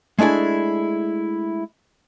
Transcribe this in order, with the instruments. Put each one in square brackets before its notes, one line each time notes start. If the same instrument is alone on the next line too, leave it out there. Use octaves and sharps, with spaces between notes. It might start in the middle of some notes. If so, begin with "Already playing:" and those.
[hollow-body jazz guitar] G#3 A3 D4 E4 G#4